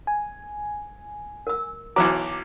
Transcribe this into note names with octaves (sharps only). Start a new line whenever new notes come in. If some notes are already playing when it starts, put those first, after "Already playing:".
G#5
A#4 E6
B1 E3 F#3 A#5 D6